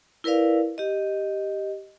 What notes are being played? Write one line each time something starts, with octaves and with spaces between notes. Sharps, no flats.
E4 A#4 B4 D5 F5
G4 D#5